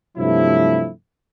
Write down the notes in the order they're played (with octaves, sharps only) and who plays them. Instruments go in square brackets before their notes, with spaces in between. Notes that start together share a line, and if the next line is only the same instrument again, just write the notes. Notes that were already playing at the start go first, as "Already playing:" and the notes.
[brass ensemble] G2 C3 F3 F#3 A3 E4